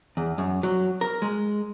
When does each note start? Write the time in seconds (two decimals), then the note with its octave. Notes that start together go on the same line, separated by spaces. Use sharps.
0.17 E2
0.38 F#2
0.63 F#3
1.01 A#4
1.22 G#3